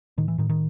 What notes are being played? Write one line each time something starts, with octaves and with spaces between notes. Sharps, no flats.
A2 D#3
E3
A2 D#3
D#3